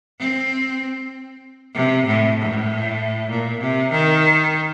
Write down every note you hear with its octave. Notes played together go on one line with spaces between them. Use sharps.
C4
C3
A2
A2
A#2
C3
D#3